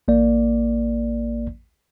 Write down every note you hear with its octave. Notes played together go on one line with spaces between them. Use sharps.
A1 A#3 D5